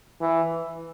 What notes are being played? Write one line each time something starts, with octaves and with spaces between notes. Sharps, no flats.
E3